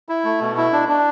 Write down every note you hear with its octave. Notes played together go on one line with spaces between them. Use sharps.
E4
A3
B2
E4
D4
D4